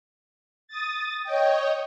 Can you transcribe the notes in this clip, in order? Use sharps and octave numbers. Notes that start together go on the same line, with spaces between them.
D#6 A6
C#5 D#5 G5